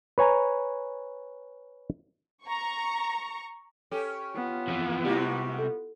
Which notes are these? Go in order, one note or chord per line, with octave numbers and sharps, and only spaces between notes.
B4 C#5 G#5 A#5
A#5 C#6
C#4 G4 A4
B3 F4
F2 E3
C3 G3 G#3 E4 F#4 G4
A4